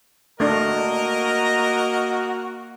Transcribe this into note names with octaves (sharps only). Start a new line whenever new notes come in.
A3 A#3 D4 F#4 A#4 D#5 A#5